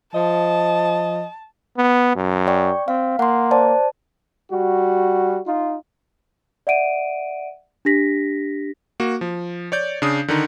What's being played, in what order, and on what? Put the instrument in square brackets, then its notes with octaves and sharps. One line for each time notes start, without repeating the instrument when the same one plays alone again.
[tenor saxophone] F3 [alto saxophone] D#5 [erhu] A5
[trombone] B3
F#2
[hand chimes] D5 G5 C#6
[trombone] C4 [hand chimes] F5
[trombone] A#3 [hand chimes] F#5 C6
[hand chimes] C5 D5 A5
[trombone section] G3 F#4
D#4 F4
[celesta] D5 E5 F#5 D7 D#7
D4 G4 A#6 B6
[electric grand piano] A#3 F#4
F3
C#5 D5 G6
C#3 D4 D#6
D3 D#3 D#4